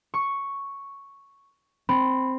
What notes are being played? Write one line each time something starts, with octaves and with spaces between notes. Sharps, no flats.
C#6
C4 B5